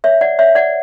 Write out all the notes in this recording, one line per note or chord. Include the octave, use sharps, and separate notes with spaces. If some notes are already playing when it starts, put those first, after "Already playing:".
C#5 E5
D5 F#5
C#5 E5
D5 F#5